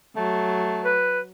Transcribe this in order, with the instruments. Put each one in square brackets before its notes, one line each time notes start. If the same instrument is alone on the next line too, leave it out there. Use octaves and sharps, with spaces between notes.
[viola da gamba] F#3 [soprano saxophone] A3
[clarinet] B4